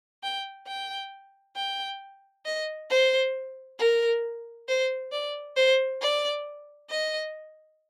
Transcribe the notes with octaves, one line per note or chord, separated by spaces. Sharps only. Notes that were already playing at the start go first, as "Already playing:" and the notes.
G5
G5
G5
D#5
C5
A#4
C5
D5
C5
D5
D#5